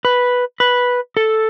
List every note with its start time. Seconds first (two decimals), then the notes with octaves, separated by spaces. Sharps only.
0.05 B4
0.60 B4
1.17 A4